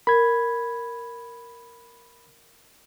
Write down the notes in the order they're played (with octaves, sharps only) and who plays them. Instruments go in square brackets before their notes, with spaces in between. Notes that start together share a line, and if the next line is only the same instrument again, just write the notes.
[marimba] A#4 [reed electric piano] B5 G#6